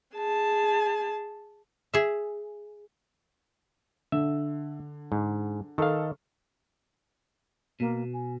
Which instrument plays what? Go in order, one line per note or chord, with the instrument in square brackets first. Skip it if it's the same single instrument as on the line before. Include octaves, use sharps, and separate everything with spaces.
[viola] G#4 A5
[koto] G#4 E5
[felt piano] D3 [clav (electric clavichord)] E5
[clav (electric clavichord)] G#2
[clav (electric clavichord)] D#3 F5 [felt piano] A4
[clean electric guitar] B2 [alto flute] A#3
[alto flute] G#5